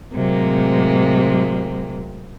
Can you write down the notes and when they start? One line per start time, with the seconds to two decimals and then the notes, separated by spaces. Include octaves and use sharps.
0.14 A2 C3 F#3 G#3 A#3 C4